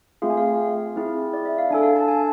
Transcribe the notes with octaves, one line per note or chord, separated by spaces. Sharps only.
A3 C4 F4 G#4 F5
G#5
F5
C4 E4 G#4
D5
E5
F5
D4 A4 G#5
F5
A5
G#5